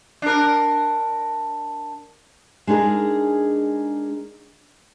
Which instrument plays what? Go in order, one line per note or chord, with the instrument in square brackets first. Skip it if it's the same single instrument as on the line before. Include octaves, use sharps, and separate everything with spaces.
[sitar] D4 A#4
[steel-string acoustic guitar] G#3 D4 D#4 G#4 A#4